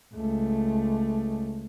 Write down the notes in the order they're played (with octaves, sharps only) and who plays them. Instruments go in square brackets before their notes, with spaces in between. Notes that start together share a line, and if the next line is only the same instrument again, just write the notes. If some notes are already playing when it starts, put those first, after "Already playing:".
[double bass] C#2 A3